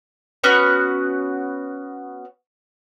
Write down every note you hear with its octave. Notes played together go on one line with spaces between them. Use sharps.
B3 C#4 F#4